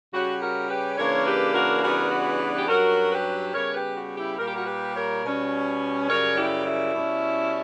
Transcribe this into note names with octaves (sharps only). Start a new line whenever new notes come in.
C#3 G3 C#4 F#4
F#4 A#4
G4 B4
C#3 E3 A#3 D4 A#4 C#5
G4 B4
F#4 A#4
C#3 E3 G3 B3 D4 F#4 A#4
F#4
G4
G2 F#3 C#4 F#4 A#4
G4 B4
C#3 G3 B3 A#4 C#5
G4 B4
F#4
E4 G4
A#2 G3 A#3 A#4
G4
F#4 A#4
G4 B4
A#4 C#5
B2 G3 C#4
F#2 C#3 G3 A#4 C#5
E4 G4
E4
B2 G3 C#4